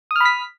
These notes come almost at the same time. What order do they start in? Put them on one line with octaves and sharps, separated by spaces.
D#6 F6 B5 B6